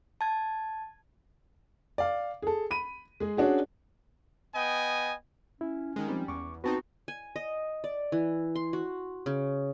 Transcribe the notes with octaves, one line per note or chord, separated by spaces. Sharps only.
A5 G#6
D5 F5
G#4 A4
B5 D#7
G#3 G#4
C#4 D4 F#4 G#4
B3 D#5 G5 G#5
C#4 E4
D#3 G#3
F3 G3 C4 D#4
E2 C#6 D6
B3 C4 D#4 F#4 B4 A5
G#5
D#5
D5
E3
C6
F#4
C#3